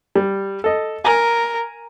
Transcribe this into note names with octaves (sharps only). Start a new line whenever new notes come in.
G3
A4 D#5
A#4 G#5 A#5